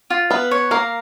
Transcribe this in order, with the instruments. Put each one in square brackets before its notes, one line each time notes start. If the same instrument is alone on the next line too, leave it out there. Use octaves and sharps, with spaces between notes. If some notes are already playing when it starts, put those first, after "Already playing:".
[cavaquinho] F4
[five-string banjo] B3 B4 [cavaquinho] F5
[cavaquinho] C#5
[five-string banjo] A#3 A#4 [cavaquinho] F5